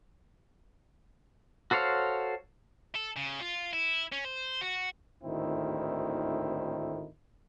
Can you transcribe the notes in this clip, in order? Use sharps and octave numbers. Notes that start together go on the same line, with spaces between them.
F#4 A4 C5 C#5 F5
A4
C#3
F4
E4
C#4
C5
F#4
G#1 D2 A2 D#3 C4 E4